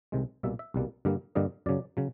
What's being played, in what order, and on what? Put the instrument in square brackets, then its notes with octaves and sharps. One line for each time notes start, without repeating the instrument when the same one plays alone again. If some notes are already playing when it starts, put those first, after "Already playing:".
[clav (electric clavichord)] C2 C3 D#3 G#3
C2 B2 G3 A#3 E5
E5
C2 B2 G3 A#3
G2 D3 G3 A#3
G2 D3 G3 A#3 D#5
F#2 C#3 F#3 D5
C#3 F#3